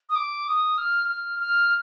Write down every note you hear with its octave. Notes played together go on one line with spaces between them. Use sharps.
D#6
D6
D#6
F6
F6
F6